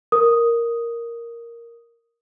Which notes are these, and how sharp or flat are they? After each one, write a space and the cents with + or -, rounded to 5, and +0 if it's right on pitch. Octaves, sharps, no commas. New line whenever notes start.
A#4 +0 D#6 +0